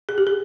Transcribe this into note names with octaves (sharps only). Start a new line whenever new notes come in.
G#4
G4
G#4